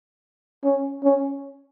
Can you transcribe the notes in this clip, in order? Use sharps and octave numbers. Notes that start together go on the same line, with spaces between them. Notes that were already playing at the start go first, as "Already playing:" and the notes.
C#4
C#4